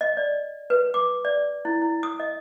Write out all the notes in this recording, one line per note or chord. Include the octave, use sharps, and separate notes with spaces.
D#5
D5
B4
D6
D5
E4
E4
D#6
D#5